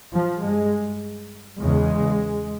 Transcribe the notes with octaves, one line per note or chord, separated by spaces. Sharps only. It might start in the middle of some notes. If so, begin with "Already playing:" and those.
F3
G2 G#3
E2 C#3 G#3